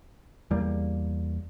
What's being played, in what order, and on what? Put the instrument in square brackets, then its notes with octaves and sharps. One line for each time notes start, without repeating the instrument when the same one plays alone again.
[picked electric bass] E2 G3 A#3